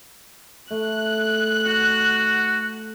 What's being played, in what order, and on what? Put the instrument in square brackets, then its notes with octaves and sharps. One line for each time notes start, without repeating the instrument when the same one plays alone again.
[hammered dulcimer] A3 [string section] F#6
[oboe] F#4 [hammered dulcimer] F#5